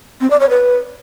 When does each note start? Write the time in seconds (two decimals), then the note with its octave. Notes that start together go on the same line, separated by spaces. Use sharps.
0.21 C4
0.30 D5
0.40 C#5
0.50 B4